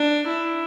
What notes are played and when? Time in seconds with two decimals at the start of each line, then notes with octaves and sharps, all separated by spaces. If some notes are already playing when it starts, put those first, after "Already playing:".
Already playing: D4
0.28 E4